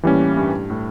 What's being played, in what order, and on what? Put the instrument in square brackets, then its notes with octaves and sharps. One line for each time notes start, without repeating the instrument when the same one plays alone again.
[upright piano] A2 [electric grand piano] E3 G3 A#3 C#4
[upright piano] G2
A2